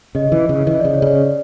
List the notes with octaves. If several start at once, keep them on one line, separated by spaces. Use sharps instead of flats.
C#3 D#5
E3
C#3
E3 D#5
C#3 D5
C#5
C#3 D5